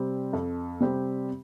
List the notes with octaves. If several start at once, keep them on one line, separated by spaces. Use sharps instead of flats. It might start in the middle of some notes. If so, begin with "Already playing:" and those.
Already playing: C3 G3 C4 G4
F2
C3 G3 C4 G4